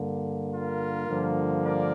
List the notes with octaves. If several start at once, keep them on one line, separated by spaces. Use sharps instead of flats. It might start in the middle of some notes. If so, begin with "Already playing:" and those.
Already playing: G2 D3 A#3
F4 A#4
G2 D3 F3 A#3
A#4 D5